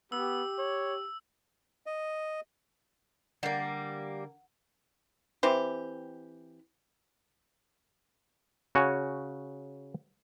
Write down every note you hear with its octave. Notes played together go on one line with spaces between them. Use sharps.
B3 G4 E6
C#5
D#5
D3 G3 A#3 A#4 F#5 C7
E3 C4 G4
C#3 F#4 C#5 G#5